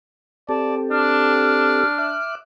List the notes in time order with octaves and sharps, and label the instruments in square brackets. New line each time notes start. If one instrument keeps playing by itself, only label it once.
[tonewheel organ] C4 G4 A4 [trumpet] D5 [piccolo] A5
[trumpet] D4 [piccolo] F6
[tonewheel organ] E5 D6 F#6